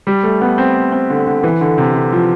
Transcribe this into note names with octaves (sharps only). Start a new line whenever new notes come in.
G3
A3
B3
C4
C4
D3
D3
E3
D3
C3
D3
F3